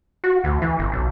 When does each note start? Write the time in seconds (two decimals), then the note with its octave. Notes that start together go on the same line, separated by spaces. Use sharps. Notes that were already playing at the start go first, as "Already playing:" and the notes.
0.24 F#4
0.44 D2
0.62 E3
0.79 G1
0.92 B1